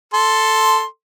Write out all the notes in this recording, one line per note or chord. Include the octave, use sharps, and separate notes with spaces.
A4 C6